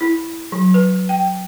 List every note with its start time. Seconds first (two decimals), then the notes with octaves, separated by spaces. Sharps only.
0.01 E4
0.52 F#3
0.74 B4
1.09 G5